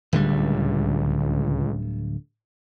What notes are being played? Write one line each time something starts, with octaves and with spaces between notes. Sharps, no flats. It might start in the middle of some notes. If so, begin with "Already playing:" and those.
D1 C#2 D3 G3